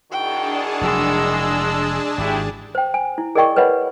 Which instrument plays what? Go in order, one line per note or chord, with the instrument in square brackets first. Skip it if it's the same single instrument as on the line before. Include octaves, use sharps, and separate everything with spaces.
[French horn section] D#3 E4 F#4 [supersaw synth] D4 G#4 A5 [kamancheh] G5
[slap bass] F1 F#3 [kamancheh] G#3 E6
[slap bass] G#1 [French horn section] E4 F#4 G4
[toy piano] C5 G5
G#5
E4
G#4 A#4 D5 D#5 G5 C#6
B4 C#5 D#5 F#5 B5